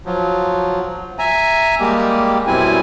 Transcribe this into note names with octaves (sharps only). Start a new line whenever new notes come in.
F3 F#3
E5 G#5 A#5
G3 G#3 A#3 G4
F#2 B2 G3 C4 E4 G#5